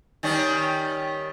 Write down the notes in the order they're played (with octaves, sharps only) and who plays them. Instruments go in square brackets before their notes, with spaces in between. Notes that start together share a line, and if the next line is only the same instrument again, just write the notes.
[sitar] D#3 G3 C#4